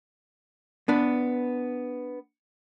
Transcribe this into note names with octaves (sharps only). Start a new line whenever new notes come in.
B3 D4 B4